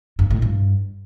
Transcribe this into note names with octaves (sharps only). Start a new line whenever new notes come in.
G2
A2
G2